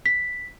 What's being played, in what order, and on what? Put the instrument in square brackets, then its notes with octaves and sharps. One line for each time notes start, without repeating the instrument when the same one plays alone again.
[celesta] B6